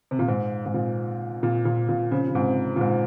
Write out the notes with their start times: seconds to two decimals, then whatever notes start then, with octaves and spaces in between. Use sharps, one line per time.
0.11 C3
0.19 A#2
0.28 G#2
0.66 G#2
0.74 A#2
1.43 A#2
1.65 A#2
1.89 A#2
2.11 C#3 F3
2.28 C#3
2.35 G#2 C3
2.76 A#2
2.81 G#2